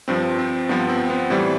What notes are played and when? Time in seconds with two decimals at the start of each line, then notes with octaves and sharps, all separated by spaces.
0.08 G2 F3 C4
0.39 C4
0.69 G2 F3 B3
0.89 C4
1.10 B3
1.30 A2 E3 G3 C4